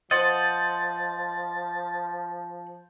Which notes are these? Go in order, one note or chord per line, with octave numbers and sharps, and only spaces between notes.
F3 C5 D#5 F#5 A6